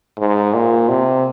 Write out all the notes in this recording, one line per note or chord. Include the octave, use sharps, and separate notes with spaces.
G#2
A#2
C3